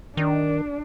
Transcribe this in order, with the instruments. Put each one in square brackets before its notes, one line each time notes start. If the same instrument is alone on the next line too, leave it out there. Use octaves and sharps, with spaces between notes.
[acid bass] D#3 [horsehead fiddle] D4